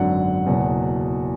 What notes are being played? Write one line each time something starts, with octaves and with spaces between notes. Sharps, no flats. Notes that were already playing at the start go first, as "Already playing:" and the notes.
Already playing: G#1 F#2 D3 F#3 F#5
F#1 E2 B2 F#3